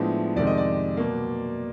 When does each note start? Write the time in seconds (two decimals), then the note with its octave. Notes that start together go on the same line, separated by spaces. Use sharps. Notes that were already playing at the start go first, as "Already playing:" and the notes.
Already playing: A2 F3 G#3 B3 D4 E5
0.36 F2 C3 D#3 G#3 D5
0.47 D#5
0.58 D5
0.97 B2 F#3 A#3